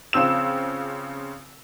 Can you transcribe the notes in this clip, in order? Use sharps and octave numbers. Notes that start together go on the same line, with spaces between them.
C#3 F3 C4 E6 E7